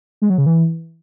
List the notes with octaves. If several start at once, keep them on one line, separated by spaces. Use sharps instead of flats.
G#3
F#3
C#3
E3